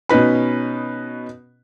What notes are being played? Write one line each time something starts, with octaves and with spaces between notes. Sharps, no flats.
B2 C#4 D#4 B4 B5